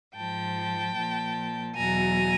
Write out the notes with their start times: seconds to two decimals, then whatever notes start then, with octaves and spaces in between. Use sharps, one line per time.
0.15 G#2 F3 G5 A5
0.96 A#2 F3
1.76 E2 B2 F#3 G#5 A#5